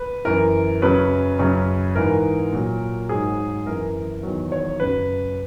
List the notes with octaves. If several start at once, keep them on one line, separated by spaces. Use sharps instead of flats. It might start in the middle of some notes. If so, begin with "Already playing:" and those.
Already playing: B4
F#2 E3 A#4
F#2 C#3 F#3 B4
F#2 C#3 F#3
G#2 E3 A#4
A#2 F#3
G#2 F#3 G#4
F#2 E3 A#4
E2 D#3 F#3
C#5
F#2 C#3 F#3 B4